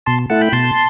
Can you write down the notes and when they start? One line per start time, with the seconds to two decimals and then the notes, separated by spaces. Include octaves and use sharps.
0.06 B2 A5 C6
0.30 A3 E4 F#5 A5
0.41 G5 B5
0.53 B2 A5 C6